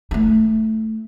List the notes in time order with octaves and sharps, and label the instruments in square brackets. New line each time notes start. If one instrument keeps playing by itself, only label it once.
[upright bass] A3 E4